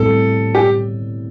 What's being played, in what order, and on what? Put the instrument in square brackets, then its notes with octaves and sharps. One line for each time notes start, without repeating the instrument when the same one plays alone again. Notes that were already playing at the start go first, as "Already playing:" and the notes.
Already playing: [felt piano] A2 G3 C4 [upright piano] A4
[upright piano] G4